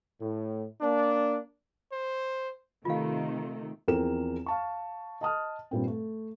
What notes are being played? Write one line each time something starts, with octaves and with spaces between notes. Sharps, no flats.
A2
A#3 D4
C5
C3 D#3 A3 F4 F5
E2 F3 C4 G#4 A#4 E7
F5 A5 C#6
D#5 A5 D#6 F6
G2 A#2 C4
A3